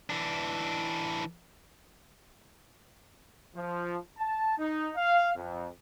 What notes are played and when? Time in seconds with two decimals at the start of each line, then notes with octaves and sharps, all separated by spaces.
0.10 E3 D4
3.56 F3
4.18 A5
4.59 D#4
4.97 F5
5.37 F2